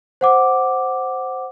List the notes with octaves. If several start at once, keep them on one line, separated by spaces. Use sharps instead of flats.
C5 F#5 D6